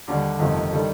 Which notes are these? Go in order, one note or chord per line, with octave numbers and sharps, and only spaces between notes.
D#2 D3 G3 D4
G1 F2 C3 D#3 A3
D#3 G3 D4 A4